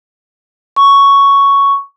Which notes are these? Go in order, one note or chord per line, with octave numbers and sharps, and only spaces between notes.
C#6